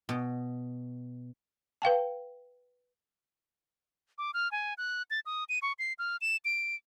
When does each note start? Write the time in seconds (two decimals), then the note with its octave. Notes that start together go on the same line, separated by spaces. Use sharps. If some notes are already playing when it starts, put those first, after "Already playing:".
0.09 B2
1.82 B4 F5 G5 A5
4.18 D6
4.34 F6
4.52 G#5
4.78 F#6
5.11 A6
5.26 D#6
5.49 D#7
5.62 C#6
5.79 C7
5.99 F6
6.21 E7
6.45 D7